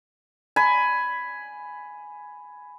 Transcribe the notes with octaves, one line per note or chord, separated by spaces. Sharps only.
G#5 B5